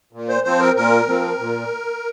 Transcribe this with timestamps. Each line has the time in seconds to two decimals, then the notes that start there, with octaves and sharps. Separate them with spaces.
0.13 A#2
0.28 C5
0.44 F3 C4 C5
0.60 A#4
0.76 A#2 A#4
1.07 F3 C4
1.39 A#2